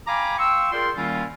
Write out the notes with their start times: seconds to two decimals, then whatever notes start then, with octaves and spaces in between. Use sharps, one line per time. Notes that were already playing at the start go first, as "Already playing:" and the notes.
0.08 F5 G5 G#5 A#5 B5 D6
0.39 F5 G5 C6 C#6 E6
0.72 F4 G#4 A#4 D5 G5 C6
0.96 D#3 G3 A#3 C#4 E4 F4